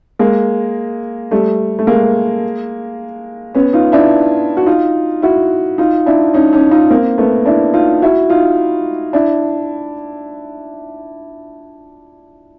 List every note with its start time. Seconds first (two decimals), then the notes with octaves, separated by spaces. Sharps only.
0.19 G#3 A#3
1.31 G3 A3
1.79 A3
1.87 G#3 A#3
3.55 B3 C#4
3.73 D#4 F4
3.92 D4 E4
4.57 F#4
4.66 D#4 F4
5.22 E4 F#4
5.78 D#4 F4
6.06 D4 E4
6.34 C#4 D#4
6.53 C#4 D#4
6.71 D#4 F4
6.90 A#3 C4
7.18 A3 B3
7.46 D4 E4
7.73 D#4 F4
8.02 E4 F#4
8.30 D#4 F4
9.13 D4 E4